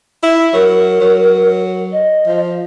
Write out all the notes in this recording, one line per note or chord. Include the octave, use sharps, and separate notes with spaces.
E4
F#3 A#4
F#3
D#5
F3